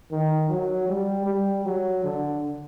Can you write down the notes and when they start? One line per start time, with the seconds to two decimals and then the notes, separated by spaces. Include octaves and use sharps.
0.11 D#3
0.49 F#3
0.89 G3
1.26 G3
1.65 F#3
2.04 D3